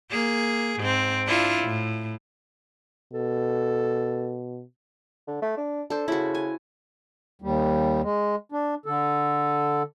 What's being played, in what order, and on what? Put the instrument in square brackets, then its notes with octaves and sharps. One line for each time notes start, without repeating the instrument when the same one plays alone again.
[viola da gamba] A#3 G#4
G#2 C4
D4 E4 F4
A2
[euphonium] B2 [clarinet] A4
[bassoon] D3
A3
D4
[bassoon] D4 [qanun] A4 C5
[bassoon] C#3 [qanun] E4 F#4
[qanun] G#5
[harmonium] D#2 G3
G#3
D4
D3 A4